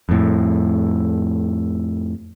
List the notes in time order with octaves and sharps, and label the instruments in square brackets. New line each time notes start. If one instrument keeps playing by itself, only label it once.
[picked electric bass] F2 A2